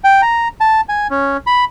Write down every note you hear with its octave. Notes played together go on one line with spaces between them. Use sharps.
G5
A#5
A5
G#5
C#4
B5